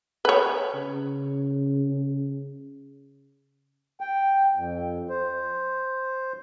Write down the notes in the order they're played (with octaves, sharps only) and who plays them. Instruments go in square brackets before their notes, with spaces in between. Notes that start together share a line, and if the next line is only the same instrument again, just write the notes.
[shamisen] B4 C#5
[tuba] C#3
[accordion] G5
F2
C5